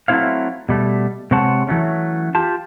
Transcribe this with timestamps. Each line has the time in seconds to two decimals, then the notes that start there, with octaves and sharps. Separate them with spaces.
0.08 F#3 A3 C4 E4 C#5 F5
0.69 B2 G3 A3
1.31 C3 G#3 C4 C#5 F#5 A5
1.67 E3 F#3 A3 C#4
2.35 F4 G4 A5